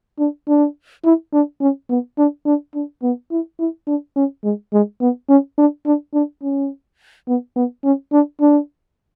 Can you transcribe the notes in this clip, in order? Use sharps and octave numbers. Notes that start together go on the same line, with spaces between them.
D4
D4
E4
D4
C#4
B3
D4
D4
D4
B3
E4
E4
D4
C#4
G#3
G#3
B3
C#4
D4
D4
D4
C#4
B3
B3
C#4
D4
D4